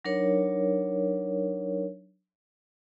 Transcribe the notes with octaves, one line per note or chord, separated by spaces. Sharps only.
F#3 D4 D#4 A#4 C#5